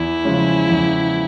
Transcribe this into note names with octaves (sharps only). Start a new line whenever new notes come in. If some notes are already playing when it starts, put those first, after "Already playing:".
Already playing: E2 E4
C#3 F3 G#3 C#4
E2